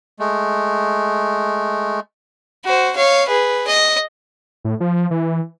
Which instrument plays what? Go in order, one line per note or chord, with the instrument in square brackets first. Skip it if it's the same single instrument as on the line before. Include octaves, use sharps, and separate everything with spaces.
[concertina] G#3 A3
[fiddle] F#4 C5
C#5 F5
G#4 B4
D#5
[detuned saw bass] A2
F3
E3